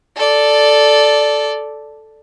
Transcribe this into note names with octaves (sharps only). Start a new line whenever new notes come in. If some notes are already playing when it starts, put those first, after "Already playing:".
A4 D5